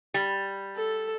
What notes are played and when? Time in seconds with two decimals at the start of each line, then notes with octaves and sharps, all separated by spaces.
0.14 G3
0.77 A4